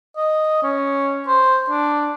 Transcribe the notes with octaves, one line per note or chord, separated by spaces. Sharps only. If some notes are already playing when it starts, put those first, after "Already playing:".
D#5
C#4
C5
D4